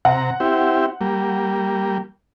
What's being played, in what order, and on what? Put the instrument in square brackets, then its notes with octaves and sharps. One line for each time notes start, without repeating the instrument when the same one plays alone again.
[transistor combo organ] C3 A#5 [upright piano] F#5
[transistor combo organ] C4 E4 G4
G3 A#3